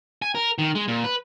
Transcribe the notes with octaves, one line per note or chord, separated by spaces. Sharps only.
G#5
A#4
D#3
G#3
A#2
B4